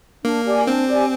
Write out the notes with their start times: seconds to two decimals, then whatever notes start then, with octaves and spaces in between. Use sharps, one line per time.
0.24 A#3 D4
0.45 G4 D5 G#5
0.67 C4 D4
0.88 G4 D5 G#5